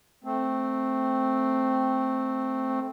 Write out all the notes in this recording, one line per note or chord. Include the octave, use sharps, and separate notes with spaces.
A3 C4